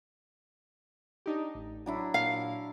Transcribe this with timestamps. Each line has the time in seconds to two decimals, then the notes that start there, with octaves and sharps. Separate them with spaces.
1.26 D4 D#4 G4
1.55 A1
1.86 F#3 D4 E4
2.14 A#2 F5